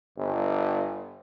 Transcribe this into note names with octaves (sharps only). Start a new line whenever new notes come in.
G1